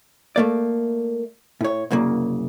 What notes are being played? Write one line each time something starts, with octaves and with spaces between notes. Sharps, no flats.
A3 A#3 D5
A2 C#5
C2 F#2 C#3 A#3